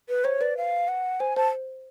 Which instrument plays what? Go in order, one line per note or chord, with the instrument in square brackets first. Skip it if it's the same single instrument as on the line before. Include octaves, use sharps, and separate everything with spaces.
[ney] B4
[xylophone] C5 [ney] C#5
[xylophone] B4 [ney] D5
[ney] F5
F#5
[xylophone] C5 [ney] G#5
[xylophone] C5 [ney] A5